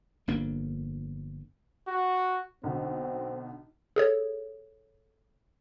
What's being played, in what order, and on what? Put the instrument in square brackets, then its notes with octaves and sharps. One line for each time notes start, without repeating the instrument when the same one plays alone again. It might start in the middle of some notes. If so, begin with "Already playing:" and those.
[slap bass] G1 F2 A#3 D4
[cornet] F#4
[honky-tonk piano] B1 D3 F#4 [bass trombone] C4
[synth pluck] G#4 A4 C#5